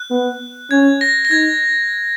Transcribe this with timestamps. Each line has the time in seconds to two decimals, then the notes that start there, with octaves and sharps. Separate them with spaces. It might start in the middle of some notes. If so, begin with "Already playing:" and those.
Already playing: F#6
0.10 B3
0.71 C#4 G#6
1.01 A#6
1.25 A#6
1.31 D#4 G#6